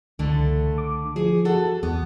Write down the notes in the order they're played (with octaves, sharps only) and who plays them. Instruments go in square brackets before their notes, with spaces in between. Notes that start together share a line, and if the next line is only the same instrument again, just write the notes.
[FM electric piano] C#2 [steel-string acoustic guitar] D3 A3
[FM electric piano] D6
[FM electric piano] F3 [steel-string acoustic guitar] G#4
[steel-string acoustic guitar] F#4 A4 F#5
[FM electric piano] E2 [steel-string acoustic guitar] B3